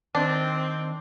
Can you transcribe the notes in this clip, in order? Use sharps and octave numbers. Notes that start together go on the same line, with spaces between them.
D#3 C4 D4 A#4 D#5